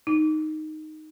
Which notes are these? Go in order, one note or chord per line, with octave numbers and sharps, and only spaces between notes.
D#4